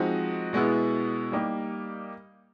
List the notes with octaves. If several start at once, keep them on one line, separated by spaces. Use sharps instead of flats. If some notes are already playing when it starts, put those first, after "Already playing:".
Already playing: F3 G#3 C4 D#4 F#4
B2 G#3 B3 E4
G3 A#3 D#4 G4